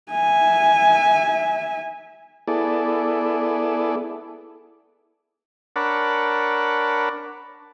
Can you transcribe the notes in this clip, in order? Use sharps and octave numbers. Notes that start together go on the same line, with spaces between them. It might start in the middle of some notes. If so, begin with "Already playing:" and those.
E5 G#5
B3 E4 G#4 A4 D5
D4 A#4 C#5 F#5 A5 B5